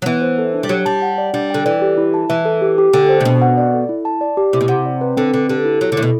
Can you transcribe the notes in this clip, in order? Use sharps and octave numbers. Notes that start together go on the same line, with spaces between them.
F#3
E3 B3
C5
A4
D4
G3
F#3 G4
G3 A5
F#5
D5
G3 D4
D3 G5
E3 D5
G4
E4
A5
E3 E5
A4
G4
G4
D3 G5
C5
C3
B2 D4
F#5
D5
A4
E4
A5
D5
G4
C3 E4
B2
C3 F#5
D5
B4
D3 C4
D3 B4
D3 G4
E4
F#3 E4
D3
A2 E4
B2